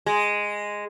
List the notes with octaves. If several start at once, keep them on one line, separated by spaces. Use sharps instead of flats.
G#3